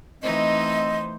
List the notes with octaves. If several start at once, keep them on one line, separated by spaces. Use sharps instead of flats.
E3 A3 C4 D#4 C5 D#5